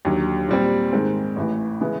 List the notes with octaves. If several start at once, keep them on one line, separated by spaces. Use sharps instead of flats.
D#2 D3 F#3
A#2 G3 C4
G#2 D#3 G#3 C4
A1 A2 E3
C#3 E3 G#3 B3